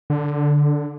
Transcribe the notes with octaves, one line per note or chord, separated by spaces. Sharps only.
D3